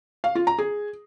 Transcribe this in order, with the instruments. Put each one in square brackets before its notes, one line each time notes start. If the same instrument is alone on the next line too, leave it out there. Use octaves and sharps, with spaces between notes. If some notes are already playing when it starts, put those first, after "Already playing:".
[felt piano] F5
F4
A#5
G#4